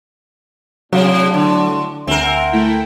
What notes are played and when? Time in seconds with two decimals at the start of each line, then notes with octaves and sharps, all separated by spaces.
0.93 A2 C3 F#3 D4 F#4
1.34 D3
2.07 D2 C4 A#4 E5 F#5 G#5
2.52 A3 E4 G5